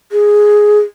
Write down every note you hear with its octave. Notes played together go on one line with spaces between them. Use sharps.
G#4